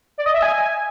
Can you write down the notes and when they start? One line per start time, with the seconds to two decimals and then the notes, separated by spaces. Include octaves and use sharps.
0.18 D5
0.26 D#5
0.34 E5
0.42 G#5